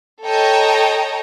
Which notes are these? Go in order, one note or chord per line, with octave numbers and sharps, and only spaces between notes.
A4 C#5 D#5 G5 A#5